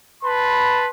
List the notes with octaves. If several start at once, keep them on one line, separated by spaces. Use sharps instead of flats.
B4 A5 B5 C6